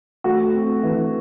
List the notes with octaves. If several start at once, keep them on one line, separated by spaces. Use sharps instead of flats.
A3 F#4
C4
E3